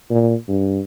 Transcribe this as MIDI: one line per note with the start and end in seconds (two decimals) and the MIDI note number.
0.10 0.35 46
0.48 0.80 43